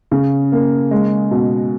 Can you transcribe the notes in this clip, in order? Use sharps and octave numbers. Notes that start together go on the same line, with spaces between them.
C#3
A#3
G#3
B2